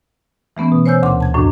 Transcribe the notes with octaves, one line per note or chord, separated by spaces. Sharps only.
E3 A3 B3 C#4
B2
C5 C#5 G#5 E6 G6
D2 A#2 C6 D6
A5 G#6
F#2 A2 D#3 D4